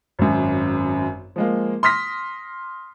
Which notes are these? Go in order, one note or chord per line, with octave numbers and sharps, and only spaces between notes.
G#1 F#2
F3 G#3 A#3
C6 D#6 F6 A#6 B6